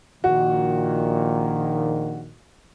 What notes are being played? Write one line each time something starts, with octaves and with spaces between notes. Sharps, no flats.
A#1 A#2 D#3 F#4